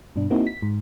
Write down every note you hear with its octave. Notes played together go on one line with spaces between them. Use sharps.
G2 B2 D4
A#3 C4 D#4 E4 F#4
B6
G#2